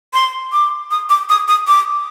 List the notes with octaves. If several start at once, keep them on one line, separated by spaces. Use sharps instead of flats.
C6
D6
D#6
D6
D#6
D#6
D6